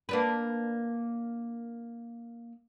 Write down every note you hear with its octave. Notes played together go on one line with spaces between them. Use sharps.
A#3 D4 B4